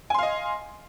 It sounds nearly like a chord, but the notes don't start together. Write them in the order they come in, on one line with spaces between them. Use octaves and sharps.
G#5 C6 F5 D#5